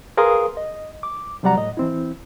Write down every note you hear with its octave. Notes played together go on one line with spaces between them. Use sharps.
G#4 A#4 B4 F5 C6 D#6
D#5
D6
C3 F#3 G3 D5 F#5 A#5
A2 D#5
E3 C4 E4